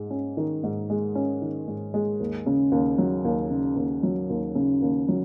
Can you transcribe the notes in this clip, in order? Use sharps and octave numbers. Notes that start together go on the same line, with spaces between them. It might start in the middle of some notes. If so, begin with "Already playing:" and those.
Already playing: G#2 G#3
C#4
D#3
G#2
G#3
C#4
D#3
G#2
G#3
D#2
C#3
D#2
F#3
D#2
C#3
D#2
F#3
D#2
C#3
D#2
F#3